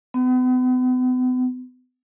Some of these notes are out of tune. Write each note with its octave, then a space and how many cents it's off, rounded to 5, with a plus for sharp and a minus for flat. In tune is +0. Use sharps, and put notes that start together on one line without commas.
B3 +40